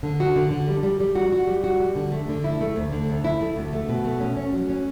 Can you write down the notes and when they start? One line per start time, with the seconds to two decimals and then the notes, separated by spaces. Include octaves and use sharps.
0.03 D3
0.20 F#4
0.36 D3
0.51 D3
0.68 G3
0.83 G3
1.00 G3
1.15 F#4
1.33 F#4
1.47 G3
1.64 F#4
1.80 G3
1.95 D3
2.12 A3
2.29 D3
2.44 E4
2.61 A3
2.76 D2
2.92 D3
3.08 D2
3.24 E4
3.41 A3
3.56 D2
3.73 A3
3.89 B2
4.05 A3
4.20 C#4
4.37 C#4
4.53 F#3
4.70 C#4